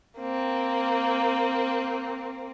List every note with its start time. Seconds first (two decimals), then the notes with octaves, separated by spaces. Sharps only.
0.18 A#3 C4